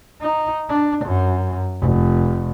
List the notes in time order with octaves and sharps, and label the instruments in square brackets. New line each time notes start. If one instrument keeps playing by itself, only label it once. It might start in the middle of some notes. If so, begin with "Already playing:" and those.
[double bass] D#4
D4
F#2
F1